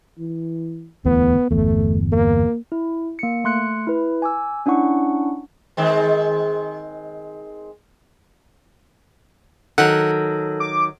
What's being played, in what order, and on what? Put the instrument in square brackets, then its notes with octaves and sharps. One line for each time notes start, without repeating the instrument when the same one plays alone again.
[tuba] E3
[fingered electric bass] D1 E2 A2 [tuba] B3
[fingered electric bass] G1 E2 [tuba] A3
[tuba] A#3
[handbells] E4
A#3 C#7
A3 C6 F#6 C#7
E4 B4
G#5 D6 E6
C#4 D4 E4 F#5 C#6
[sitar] D#3 G#3 C4
[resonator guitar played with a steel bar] D#3 F#3 [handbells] A4 [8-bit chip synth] F#5
[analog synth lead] D6